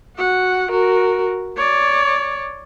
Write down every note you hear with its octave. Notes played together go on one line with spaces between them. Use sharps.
F#4 F#5
F#4 A#4
C#5 D5